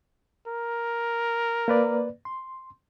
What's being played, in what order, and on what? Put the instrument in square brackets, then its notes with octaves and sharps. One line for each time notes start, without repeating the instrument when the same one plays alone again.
[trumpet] A#4
[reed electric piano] A#3 B4 D5
C6